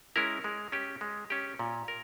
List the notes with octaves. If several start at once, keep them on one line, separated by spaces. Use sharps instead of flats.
G#3 C#4 E4 A#4
G#3
C#4 G4
G#3
C#4 G4
A#2
A#4